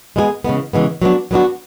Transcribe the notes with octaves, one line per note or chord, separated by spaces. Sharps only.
G#3 B3 E4 G#4
C#3 E3 G#3 B3
C#3 E3 G#3 B3
F#3 B3 D4 F#4
F#3 B3 D4 F#4